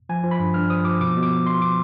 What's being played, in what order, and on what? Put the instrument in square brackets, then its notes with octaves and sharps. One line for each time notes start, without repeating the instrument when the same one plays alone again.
[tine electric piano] F3 G#5
F3
B5
G2
G2 F6
F3 D#6
F3 D6
B2 D6
B2
D6
B2
B2 C6
B2 D6